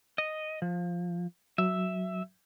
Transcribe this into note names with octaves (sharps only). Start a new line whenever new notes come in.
D#5
F3
F#3 E5